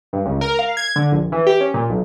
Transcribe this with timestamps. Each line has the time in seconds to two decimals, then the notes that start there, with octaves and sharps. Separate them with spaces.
0.13 G2
0.26 C#2
0.41 A#4
0.59 F5
0.77 G#6
0.96 D3
1.12 A#1
1.32 E3
1.47 G4
1.61 C#4
1.74 A#2
1.89 B1